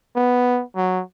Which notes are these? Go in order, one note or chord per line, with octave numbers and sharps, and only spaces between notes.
B3
F#3